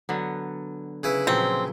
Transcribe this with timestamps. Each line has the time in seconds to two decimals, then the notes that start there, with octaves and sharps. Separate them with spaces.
0.09 D3 F#3 B3
1.03 C#3 E4 B4
1.27 A#2 F3 F#3 C4